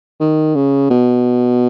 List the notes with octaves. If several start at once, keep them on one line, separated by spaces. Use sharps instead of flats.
D#3
C#3
B2